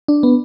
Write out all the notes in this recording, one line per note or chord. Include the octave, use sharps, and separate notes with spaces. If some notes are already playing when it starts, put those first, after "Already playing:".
D4
B3